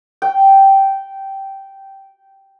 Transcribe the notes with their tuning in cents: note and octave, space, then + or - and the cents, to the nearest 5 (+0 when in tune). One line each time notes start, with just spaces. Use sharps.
G5 -10